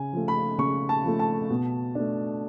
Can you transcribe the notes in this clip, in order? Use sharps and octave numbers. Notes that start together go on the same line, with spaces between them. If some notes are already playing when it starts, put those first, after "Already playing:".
Already playing: C#3 G#5
F3 A3
B5
C#3 C#6
A5
F3 A3
A5
B2
A3 D4